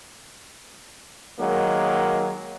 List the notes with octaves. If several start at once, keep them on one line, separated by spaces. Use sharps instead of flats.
D#3 F#3 G#3 A#3